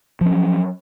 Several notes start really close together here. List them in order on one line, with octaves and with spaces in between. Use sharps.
F3 C#4 F#3